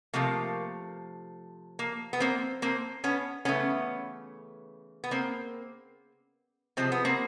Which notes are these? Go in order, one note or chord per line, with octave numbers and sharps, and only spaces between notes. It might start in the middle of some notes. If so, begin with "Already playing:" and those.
C3 F3 A3 A#3
A#3
B3
A#3 C4
A#3 C4
B3 C#4
C#3 E3 A3 B3 C#4
B3
A#3 C4
C3 F3 G#3 C4
B3
A#3 C4